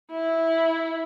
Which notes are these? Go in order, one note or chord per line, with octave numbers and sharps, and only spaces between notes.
E4